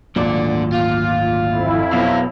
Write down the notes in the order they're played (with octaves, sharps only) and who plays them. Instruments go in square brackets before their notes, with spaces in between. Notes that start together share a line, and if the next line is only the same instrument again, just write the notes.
[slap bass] G#1 D2 F#3 [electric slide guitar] A#2 [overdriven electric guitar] D3 D5
[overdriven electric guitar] F4
[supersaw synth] F2 E4
[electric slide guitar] B2 F#3 [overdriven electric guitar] B4 F5